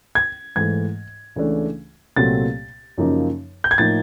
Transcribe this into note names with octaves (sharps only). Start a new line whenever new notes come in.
G#6
G#2 E3 A3 G#6
C#2 C#3 E3 A3 D4
C2 A#2 F#3 A3 C4 A6
F#2 C#3 F3 A#3 D#4
G6
G#6
A2 F3 A#3 D#4 A6